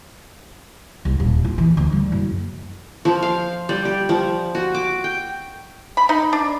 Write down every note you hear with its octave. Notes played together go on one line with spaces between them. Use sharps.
C2
D#1
F4
E3
D2
G3
F#1
F3
F5
G3
G4
F3
F#4
D6
G5
B5
D#4
D4